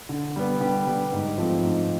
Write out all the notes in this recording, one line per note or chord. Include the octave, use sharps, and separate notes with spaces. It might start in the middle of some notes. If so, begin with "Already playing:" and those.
D3
G3 B3
D3 G4
G3 B3
G#2
F3 A3 C4
G#2